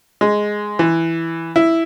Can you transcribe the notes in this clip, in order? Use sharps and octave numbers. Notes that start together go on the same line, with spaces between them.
G#3
E3
E4